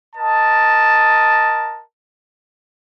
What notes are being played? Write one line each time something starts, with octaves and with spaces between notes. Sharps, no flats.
A#4 D#5 A5